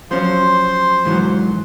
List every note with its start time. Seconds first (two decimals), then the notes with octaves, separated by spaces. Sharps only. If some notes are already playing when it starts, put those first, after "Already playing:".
0.11 F3 F#3 C#4 C5 C6
1.05 G#2 E3 F#3